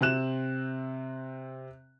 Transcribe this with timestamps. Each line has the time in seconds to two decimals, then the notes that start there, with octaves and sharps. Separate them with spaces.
0.01 C3 C4 F#6 E7